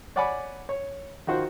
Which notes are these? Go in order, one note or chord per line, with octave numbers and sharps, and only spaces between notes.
C#5 D5 F#5 G#5 B5 D6
C#5
D#3 F4 F#4 C5 F#5